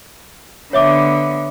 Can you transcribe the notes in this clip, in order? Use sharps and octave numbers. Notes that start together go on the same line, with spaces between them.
D3 B3 C#5 E5 D6